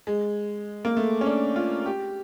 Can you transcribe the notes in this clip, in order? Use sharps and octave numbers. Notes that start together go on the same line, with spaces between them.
G#3
A#3
A3
C#4
D4
F4
G4